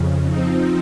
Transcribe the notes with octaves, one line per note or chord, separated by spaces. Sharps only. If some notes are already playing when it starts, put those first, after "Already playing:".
Already playing: F2 C#3
F3 C4 D#4